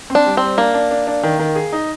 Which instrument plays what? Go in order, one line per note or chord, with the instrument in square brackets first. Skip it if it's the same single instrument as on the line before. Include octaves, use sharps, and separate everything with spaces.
[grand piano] C4
[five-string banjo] D4
[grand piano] G3
[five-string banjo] C4
[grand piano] G3
[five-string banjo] A#3 [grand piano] D4
[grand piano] D4
D4
D4
D#3
D#3
G#4
D#4